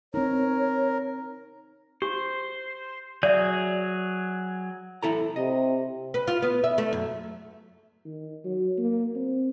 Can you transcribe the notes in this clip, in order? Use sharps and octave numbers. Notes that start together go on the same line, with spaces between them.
C4 D#4 A#4 C#5
G4 C5
F#3 G#4 D5 E5 G6
E4 A4 A#5
C3 D#5
B4
F4
B3
E5
A3
F#2
D#3
F#3
A#3
C4